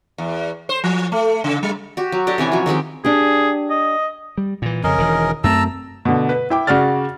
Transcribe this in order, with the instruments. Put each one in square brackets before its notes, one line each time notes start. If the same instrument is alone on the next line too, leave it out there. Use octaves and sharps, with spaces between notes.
[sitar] E2
C5
F3
A3
C#3
G3
[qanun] F#4 G4
F#3
D4 G4 A4 D#5
C3 E3 C#4 G#5
F3 F#3
D#3 G#3 C4 G4
[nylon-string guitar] D4 G4 [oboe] G#4
[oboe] D#5
[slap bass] G3
A#2 E3
[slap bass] F2 C#3 [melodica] C#4 A#4 D#5
[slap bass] E1 D#3 E3
[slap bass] F#2 A3 C4 [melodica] A5 A#5 E6
[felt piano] B2 D3
B4
E4 G5 D6
C#3 F#4 D5 F6 A6